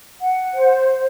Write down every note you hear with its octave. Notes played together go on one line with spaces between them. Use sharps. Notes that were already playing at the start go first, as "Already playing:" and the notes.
F#5
C5